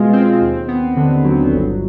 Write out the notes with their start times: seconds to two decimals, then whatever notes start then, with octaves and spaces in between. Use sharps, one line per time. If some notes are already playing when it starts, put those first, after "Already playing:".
Already playing: B2 G#3 F4
0.13 C4
0.41 D#2
0.68 B3
0.97 D3
1.25 F#3
1.53 G1